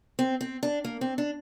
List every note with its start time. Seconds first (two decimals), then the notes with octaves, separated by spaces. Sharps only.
0.19 C4
0.41 C4
0.63 D4
0.84 A#3
1.01 C4
1.18 D4